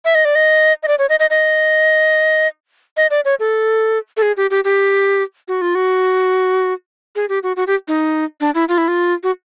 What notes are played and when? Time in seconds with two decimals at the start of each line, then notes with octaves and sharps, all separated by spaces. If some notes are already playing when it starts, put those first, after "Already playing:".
0.05 E5
0.15 D#5
0.25 D5
0.35 D#5
0.83 D#5
0.88 D5
0.99 C#5
1.09 D#5
1.19 D#5
1.30 D#5
2.97 D#5
3.11 D5
3.25 C#5
3.40 A4
4.17 A4
4.22 G#4
4.37 G4
4.50 G4
4.64 G4
5.48 F#4
5.61 F4
5.75 F#4
7.16 G#4
7.29 G4
7.43 F#4
7.56 F#4
7.67 G4
7.88 D#4
8.41 D4
8.55 E4
8.69 F4
8.78 E4
8.88 F4
9.23 F#4